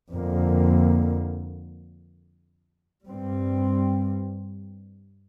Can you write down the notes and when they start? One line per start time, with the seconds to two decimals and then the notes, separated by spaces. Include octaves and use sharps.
0.12 F2 D3 A#3
3.07 G2 G3 C4